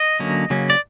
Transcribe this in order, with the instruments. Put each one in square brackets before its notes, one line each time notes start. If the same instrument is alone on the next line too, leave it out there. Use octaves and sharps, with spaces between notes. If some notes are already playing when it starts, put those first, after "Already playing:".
Already playing: [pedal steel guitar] D#5
D3 F#3 A#3 C#4
C#3 F#3 A#3 C#4
D5